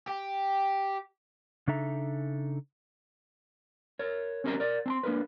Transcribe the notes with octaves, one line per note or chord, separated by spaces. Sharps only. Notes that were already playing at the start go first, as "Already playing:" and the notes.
G4
C#3 D4 D#4 A4 E5 A#5
A#4 C#5
C4 C#4 G4 A#4 D#5 A#5
A#4 D5
C4 A5 C6
A#3 D4 F#4 A#4 B4